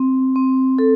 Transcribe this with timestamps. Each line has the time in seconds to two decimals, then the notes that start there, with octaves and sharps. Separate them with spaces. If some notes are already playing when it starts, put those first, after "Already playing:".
Already playing: C4
0.36 C4
0.79 A4